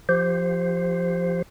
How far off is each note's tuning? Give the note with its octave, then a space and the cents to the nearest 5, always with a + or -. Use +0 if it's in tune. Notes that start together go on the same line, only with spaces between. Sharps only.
F3 +0 G4 +0 C5 +0